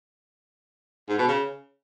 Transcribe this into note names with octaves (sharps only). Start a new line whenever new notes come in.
G#2
B2
C#3